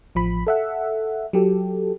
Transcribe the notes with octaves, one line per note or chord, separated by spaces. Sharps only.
A1 F3 B5
A4 E5 F#5
F#3 G4 A4